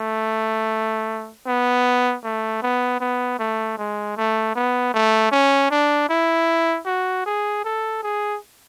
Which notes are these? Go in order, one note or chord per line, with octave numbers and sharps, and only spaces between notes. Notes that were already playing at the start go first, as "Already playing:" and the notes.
Already playing: A3
B3
A3
B3
B3
A3
G#3
A3
B3
A3
C#4
D4
E4
F#4
G#4
A4
G#4